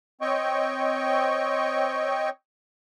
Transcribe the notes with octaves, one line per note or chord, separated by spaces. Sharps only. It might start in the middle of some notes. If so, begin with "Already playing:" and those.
C4 C#5 D#5 G5 C#6